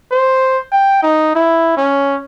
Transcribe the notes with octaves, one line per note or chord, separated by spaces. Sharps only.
C5
G5
D#4
E4
C#4